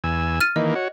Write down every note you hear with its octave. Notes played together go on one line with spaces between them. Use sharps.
E2 G#5 E6
F6 A6 D#7
D#3 E3 A#3 D#5
F#4 C#5